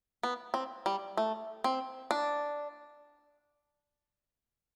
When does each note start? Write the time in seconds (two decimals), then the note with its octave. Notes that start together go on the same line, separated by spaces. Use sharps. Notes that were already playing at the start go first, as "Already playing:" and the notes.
0.23 B3
0.54 C4
0.86 G3
1.17 A3
1.64 C4
2.11 D4